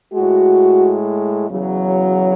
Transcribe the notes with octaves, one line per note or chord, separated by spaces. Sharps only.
A2 G#3 F#4
E2 C#3 F#3